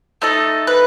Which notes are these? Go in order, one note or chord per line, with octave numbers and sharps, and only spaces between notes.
A3 D#4 A4
B4